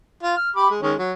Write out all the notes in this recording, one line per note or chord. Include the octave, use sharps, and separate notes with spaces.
F4
F6
G4 B5 D6
G#3
D#3 G#3 C#4
F#3